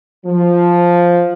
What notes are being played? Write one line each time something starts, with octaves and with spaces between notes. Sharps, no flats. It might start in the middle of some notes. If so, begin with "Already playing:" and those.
F3